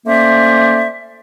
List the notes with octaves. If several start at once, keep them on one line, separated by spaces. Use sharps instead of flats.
A3 A#3 C#4 C5 D5 E5